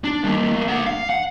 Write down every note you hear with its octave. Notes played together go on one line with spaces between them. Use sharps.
D4
G3 A#3
A3 A#3
A3 F#5
F5
F#5